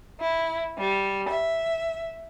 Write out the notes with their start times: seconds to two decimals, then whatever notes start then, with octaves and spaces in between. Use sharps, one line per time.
0.21 E4
0.79 G3
1.29 E5